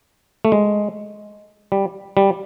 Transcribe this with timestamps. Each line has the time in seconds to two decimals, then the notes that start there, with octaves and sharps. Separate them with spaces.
0.45 A3
0.52 G#3
1.72 G3
2.17 G3